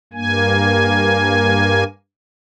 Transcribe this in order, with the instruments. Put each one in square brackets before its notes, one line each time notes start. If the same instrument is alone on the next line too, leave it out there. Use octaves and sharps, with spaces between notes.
[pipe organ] G2 A#3 G#5